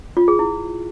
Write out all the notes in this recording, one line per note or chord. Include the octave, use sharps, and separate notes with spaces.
F4
G#4
E4